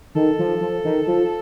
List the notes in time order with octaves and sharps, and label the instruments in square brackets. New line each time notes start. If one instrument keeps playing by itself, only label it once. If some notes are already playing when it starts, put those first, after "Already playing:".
[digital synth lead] D#3 [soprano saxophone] A4
[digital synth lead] F3
F3
D#3
F3